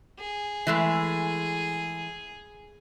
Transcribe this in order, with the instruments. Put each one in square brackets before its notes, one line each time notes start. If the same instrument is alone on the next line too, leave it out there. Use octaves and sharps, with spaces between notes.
[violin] G#4
[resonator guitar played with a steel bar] E3 G#3 A3